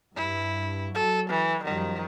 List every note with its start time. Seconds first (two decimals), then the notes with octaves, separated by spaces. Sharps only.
0.16 G2 E4
0.95 F#3 A4
1.30 E3
1.64 F#2 D#3 F3 G3